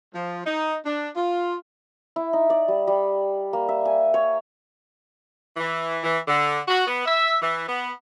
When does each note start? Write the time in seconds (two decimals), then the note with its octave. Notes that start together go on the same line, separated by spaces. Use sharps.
0.15 F3
0.46 D#4
0.85 D4
1.16 F4
2.16 E4
2.33 D#4
2.50 D5
2.68 G3
2.87 G3
3.53 A#3
3.69 E5
3.85 G#5
4.14 C#5
5.57 E3
6.03 E3
6.28 D3
6.68 F#4
6.87 B3
7.06 E5
7.42 E3
7.68 B3